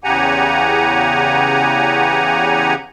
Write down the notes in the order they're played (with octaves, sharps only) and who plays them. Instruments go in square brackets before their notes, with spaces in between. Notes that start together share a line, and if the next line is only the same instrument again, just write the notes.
[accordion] E2 C#3 G4 F#5 G#5 A#5